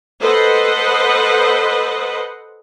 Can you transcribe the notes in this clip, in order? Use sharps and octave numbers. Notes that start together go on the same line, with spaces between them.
A4 B4 C5 D#5 F#5